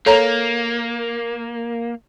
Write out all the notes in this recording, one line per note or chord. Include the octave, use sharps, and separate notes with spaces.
A#3 A4 C#5 A#5